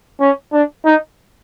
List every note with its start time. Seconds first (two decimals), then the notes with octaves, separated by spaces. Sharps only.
0.21 C#4
0.53 D4
0.85 D#4